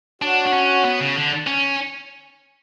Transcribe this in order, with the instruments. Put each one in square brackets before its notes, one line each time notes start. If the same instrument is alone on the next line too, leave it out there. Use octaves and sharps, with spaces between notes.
[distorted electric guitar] D4 [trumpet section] F#4 C#5 F#5
[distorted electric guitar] D4
C#4
B3
C#3
D3
C#4